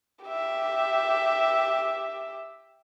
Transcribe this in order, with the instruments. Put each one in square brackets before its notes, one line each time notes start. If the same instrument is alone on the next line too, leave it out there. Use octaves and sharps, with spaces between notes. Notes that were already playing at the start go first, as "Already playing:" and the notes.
[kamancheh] G4 E5